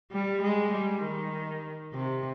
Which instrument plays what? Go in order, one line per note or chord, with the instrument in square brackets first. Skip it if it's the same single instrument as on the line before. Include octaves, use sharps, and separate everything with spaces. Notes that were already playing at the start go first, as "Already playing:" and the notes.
[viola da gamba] G3
G#3
G3
D#3
C3